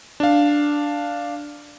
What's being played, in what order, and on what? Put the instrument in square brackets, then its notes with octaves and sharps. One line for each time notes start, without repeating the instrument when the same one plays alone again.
[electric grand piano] D4 F5